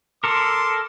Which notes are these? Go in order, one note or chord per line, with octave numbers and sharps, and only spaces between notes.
A4 A#4 C6 D6